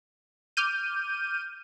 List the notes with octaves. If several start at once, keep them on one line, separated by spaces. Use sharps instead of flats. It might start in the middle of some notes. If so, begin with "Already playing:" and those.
D6 F6 G6 D#7